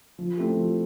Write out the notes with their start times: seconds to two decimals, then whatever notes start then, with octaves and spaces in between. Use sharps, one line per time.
0.19 F3
0.37 A3 C4 E4 G4
0.57 F3